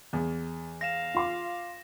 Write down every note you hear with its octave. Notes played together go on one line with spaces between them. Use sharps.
E2
F5 A#6 E7
F4 C6 D6